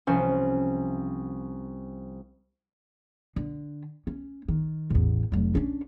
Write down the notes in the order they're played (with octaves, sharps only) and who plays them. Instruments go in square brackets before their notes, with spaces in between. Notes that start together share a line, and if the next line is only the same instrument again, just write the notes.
[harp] C2 F3 C#4 C5
[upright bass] D3
C#4
D#3
A1 E2
F1 F#3
C#4 D4